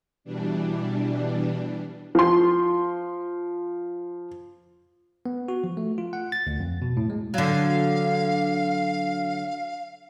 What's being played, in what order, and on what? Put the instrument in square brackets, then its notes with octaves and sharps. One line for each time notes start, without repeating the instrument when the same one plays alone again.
[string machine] B2 E3 G3 D4
[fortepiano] F3 C6
[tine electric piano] B3
F#4
F3
A3
F4
F#5
A6
D2
F2
B2
A2
G#3
[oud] D3 F#3 [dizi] F5